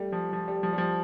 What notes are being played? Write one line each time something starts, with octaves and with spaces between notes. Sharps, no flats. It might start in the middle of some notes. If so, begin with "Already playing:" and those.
Already playing: G3 A3
F3
F3
G3
F3
G3
F3